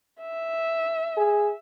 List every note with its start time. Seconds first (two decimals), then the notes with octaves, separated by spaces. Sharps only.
0.20 E5
1.17 G#4